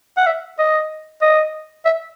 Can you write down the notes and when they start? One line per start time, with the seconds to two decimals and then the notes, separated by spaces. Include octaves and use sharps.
0.17 F#5
0.26 E5
0.59 D#5
1.22 D#5
1.85 E5